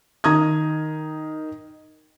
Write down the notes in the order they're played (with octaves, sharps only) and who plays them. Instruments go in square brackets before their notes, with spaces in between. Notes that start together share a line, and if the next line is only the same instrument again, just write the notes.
[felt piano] D#3 A#5 D#6 G#6